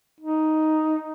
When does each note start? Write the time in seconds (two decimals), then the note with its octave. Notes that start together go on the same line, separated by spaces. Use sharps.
0.21 D#4